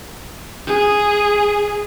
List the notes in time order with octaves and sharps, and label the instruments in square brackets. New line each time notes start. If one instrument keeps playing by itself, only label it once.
[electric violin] G#4